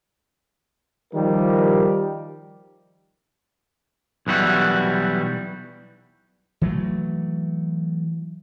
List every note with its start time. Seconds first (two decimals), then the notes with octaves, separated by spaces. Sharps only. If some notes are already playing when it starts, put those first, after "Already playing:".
1.13 D#3 F3 G3 G4 A#4
4.27 B1 E3 G3 F#4
6.61 E3 F#3 A3